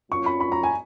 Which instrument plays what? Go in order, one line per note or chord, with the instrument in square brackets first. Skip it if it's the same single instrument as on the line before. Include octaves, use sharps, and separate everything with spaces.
[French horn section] A#2 F#3 C#4 F4 [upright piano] C#6
[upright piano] B5
B5
A#5
G#5